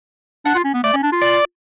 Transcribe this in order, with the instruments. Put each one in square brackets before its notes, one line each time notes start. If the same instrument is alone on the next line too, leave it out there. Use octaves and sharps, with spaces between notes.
[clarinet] D4 [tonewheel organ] F#5
[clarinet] F4
C#4
B3
[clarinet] A3 [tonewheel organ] D5
[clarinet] C#4
D4
F4
[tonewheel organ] D5